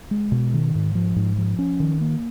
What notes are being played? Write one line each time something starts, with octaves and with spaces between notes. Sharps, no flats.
G#3
B2
D#3
G#2
F3
G#2
F3
C#4
D#3
A#3